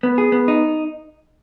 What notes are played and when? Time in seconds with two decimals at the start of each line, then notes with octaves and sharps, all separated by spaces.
0.03 B3
0.18 G#4
0.32 B3
0.48 D#4